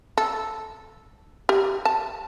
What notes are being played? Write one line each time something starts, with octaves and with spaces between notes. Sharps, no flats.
A4
G4
A5